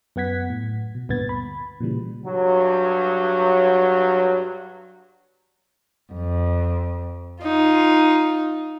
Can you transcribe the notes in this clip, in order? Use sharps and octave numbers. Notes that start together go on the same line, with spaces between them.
F#2 B3 F#5 G#6 B6
A2
B2
D2 G2 A#2 B3 G#6 A6
B5
A#2 C#3 E3 G3
G2 F#3
F2
D#4 F4